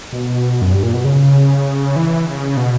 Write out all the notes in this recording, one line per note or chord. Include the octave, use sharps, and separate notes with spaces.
B2
F#2
G2
A#2
B2
C#3
E3
C#3
B2